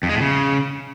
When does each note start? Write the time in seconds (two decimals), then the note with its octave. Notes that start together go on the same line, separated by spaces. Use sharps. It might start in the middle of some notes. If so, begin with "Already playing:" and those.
0.03 F2
0.09 G#3
0.15 A2
0.21 C#3